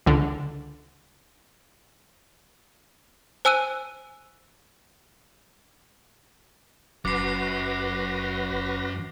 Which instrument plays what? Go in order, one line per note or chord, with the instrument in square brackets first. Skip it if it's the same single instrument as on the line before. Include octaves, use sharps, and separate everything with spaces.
[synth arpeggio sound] C#2 D3
[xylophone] C5 G#5 E6 F#6 D#7
[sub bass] F#1 [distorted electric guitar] F#2 [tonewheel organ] F#4 B4 A#6 [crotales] D6 C7